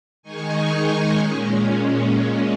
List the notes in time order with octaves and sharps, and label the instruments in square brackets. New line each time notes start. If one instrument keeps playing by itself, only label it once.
[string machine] D#3 G#3 D#4 G#5 C#6
A#2 G#3 C#4